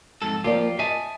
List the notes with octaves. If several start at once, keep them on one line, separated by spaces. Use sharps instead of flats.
F2 G#2 A4
F3 A#3 F4 G4 D5
D#5 E5 G#5 A5